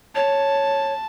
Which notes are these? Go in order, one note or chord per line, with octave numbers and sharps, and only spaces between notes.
C#5 A5